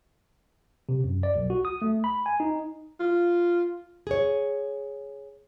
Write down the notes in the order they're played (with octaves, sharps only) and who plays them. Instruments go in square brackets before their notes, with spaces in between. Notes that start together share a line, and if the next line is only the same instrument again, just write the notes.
[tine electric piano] C3
F#2
D5
B1
F#4
D#6
A3
B5
G#5
D#4
[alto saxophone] F4
[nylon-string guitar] G#4 C#5